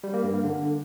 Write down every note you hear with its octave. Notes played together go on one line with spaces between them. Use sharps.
G3
A#3
G2
A#3
D3